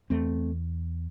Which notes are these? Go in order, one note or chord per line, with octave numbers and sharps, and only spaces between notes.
E2 A3 C4